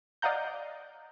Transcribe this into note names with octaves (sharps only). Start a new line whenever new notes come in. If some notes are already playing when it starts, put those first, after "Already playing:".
D5 D#5 F5 F#5 A#5 G6